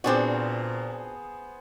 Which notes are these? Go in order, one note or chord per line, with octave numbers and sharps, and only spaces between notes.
A#2 B3 C4 D4 F#4 G#4 C5